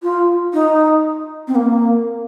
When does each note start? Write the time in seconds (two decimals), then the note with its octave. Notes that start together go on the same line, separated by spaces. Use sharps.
0.02 F4
0.53 D#4
1.47 C4
1.55 A#3